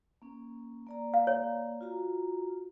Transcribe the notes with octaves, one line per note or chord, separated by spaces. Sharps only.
A#3 C#4
A#3 D5 A#5
F5
C#5
F4 F#4 A#5